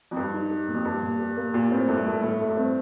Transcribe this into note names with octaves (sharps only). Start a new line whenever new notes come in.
F2
G2 G3
D#4
G3
A#2
F2
G2 G3
A#2
G3
A#3
A#2 G4
A2 C4
G2 A3
G2 A3
A2 A3
A3
G2
C4